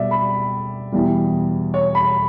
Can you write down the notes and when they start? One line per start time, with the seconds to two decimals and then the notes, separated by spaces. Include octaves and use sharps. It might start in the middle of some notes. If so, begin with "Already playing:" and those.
Already playing: B2 G3 D5 E5
0.11 B5
0.92 E2 B2 G3
1.74 C#5
1.95 B5